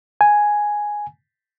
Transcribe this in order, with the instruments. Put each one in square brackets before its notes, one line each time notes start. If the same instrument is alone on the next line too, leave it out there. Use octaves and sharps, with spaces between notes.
[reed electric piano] G#5